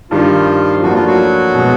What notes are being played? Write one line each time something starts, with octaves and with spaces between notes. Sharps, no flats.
G2 D#3 F3 G3 F4
A2 F3 A#3 D4 F#4
F4
F#3 F#4
B2 G#3 B3